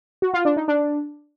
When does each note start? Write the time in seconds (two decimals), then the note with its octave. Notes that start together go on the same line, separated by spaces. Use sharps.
0.22 F#4
0.34 F4
0.45 D4
0.57 D#4
0.68 D4